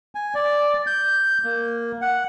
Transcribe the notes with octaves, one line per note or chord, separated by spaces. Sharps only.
G#5
D5
G6
A#3
F#5